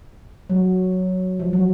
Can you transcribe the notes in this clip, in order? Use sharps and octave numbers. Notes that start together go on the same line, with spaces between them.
F#3
F3
F#3